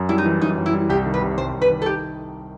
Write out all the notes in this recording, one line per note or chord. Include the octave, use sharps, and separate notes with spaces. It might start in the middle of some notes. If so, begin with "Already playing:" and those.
Already playing: F#2
G3 E4
D#4
E3
F#2 D#4
F#2
E4
G3
C2 G4
D#3
B4
C3
C2 C5
C2
B4
D#3
A4
D#4 G4